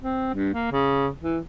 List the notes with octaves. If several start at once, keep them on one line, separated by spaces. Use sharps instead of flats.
C4
G2
A#3
C#3
E3